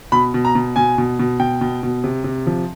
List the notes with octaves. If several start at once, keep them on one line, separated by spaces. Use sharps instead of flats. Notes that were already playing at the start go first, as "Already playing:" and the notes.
B2 B5
B2
A#5
B2
B2 G#5
B2
B2
B2 G5
B2
B2
C3
C3
F3